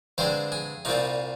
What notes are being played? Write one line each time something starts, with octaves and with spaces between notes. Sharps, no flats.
G2 D3 G#3 C4 C5
G#4
C2 A#2 G3 C4 D#4